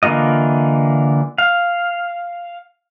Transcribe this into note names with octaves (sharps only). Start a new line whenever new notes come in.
D3 E3 A#3 F4 D#5
F5